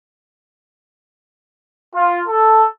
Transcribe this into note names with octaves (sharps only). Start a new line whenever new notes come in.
F4
A4